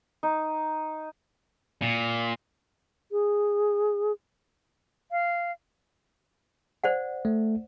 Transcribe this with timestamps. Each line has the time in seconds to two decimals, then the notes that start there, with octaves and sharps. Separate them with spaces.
0.23 D#4
1.82 A#2
3.12 G#4
5.11 F5
6.84 C5 D5 F#5
7.25 A3